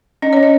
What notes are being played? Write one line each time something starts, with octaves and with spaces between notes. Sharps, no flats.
C#4 D#5
C#4 C#5
D#5